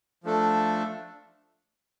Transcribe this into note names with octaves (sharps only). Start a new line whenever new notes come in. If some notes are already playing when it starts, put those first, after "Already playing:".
F3 A3 D4 A4